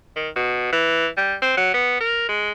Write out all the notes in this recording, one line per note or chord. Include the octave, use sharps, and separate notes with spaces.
D#3
B2
E3
G3
C4
F#3
B3
A#4
G#3